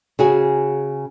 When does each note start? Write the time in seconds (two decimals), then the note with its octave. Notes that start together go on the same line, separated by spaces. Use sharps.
0.19 C#3 F#4 G#4